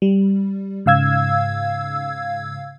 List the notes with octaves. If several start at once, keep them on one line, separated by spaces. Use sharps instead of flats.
G3
G#2 C#3 F5 E6 G#6